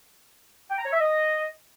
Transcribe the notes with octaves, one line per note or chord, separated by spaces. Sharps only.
G5
A#5
C#5
E5
D#5